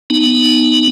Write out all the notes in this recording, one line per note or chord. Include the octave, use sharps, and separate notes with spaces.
B3 D#4